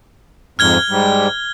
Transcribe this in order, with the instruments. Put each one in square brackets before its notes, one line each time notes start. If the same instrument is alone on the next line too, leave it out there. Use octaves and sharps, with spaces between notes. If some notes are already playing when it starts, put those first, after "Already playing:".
[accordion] F2 G#2 [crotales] F6 G#6 G7
[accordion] G#2 G3